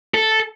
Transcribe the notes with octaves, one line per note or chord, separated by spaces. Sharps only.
A4